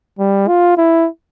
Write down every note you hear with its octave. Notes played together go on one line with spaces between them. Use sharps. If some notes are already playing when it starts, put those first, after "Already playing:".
G3
F4
E4